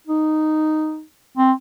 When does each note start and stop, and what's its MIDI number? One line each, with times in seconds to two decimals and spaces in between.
0.07 1.02 63
1.38 1.53 60